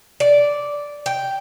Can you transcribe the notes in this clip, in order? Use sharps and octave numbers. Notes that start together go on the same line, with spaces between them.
D5
G5